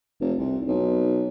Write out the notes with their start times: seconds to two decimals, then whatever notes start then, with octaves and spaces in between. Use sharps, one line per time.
0.21 F1
0.39 C2
0.67 B1